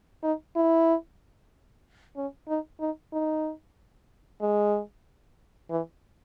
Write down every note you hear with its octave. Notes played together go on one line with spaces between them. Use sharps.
D#4
E4
C#4
D#4
D#4
D#4
G#3
E3